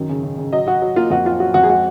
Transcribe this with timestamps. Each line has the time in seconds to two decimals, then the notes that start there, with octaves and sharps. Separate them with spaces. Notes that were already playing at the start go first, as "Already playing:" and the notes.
Already playing: F#2 D#3
0.10 C#3
0.23 C#3
0.38 C#3
0.52 F#3 D#5
0.67 F#3 F#4
0.82 F#3
0.96 A#3 F4
1.10 F2 F#4
1.25 F#3 F4
1.40 F#3 F#4
1.54 F2 F#4
1.63 G#4
1.69 G#3 F#4